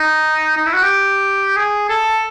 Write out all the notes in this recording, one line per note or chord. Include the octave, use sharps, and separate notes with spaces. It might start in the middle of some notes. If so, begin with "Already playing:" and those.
Already playing: D#4
D#4
E4
F#4
G4
G#4
A4